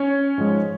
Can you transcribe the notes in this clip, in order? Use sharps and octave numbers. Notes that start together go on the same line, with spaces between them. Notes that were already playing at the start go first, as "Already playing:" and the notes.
Already playing: C#4 C#5
G#2 F3 G#3